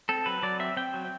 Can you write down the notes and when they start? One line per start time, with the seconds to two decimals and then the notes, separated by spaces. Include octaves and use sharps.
0.09 C4 A4
0.26 F#3 B4
0.43 F#3 D5
0.60 C4 E5
0.77 C4 G5
0.94 F#3